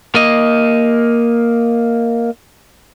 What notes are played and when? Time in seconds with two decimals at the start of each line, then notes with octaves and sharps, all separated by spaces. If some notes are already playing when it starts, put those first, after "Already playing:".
0.15 A#3 D#5